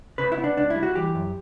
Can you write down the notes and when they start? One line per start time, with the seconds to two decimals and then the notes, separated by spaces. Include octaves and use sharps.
0.18 C#3 B4
0.32 E4
0.38 B3
0.44 D4
0.57 C#2 D4
0.70 E4
0.76 G3
0.83 F#4
0.95 E3 G4
1.15 F#2